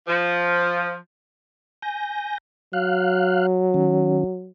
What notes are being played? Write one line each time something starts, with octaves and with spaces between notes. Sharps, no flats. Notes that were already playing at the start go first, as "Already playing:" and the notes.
F3
G#5 G6 A#6
F#3 F5 F6 F#6
D#3 C#4